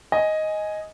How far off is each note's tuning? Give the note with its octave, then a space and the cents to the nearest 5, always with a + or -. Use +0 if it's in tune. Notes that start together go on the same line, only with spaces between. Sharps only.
D#5 +5 G#5 +0